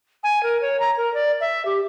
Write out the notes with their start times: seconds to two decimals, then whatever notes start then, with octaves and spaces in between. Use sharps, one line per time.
0.23 G#5
0.43 A#4
0.61 C#5
0.79 A#5
0.97 A#4
1.14 D5
1.40 E5
1.65 G4